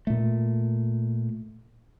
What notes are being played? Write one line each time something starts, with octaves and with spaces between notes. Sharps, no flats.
A#2 A3